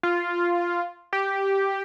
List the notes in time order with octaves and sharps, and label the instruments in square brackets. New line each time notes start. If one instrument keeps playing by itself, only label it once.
[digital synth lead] F4
G4